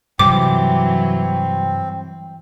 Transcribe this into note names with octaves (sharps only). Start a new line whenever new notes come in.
G2 C3 E3 F#3 G3 C4 D6